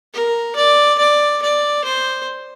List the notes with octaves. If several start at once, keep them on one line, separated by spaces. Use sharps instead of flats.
A#4
D5
D5
D5
C5